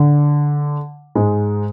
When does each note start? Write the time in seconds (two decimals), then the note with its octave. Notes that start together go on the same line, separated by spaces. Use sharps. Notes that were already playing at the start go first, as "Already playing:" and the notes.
Already playing: D3
1.15 G#2 G#3